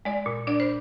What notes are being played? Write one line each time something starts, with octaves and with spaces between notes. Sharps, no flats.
G#3 D5
A#2
D4 D5
C5